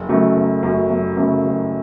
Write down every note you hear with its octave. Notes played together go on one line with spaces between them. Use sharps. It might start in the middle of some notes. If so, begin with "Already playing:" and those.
Already playing: F#1
F#2 C#3 F#3 A3
F#1
F#2 C#3 F#3 A3
F#1
F#2 C#3 F#3 A3
F#1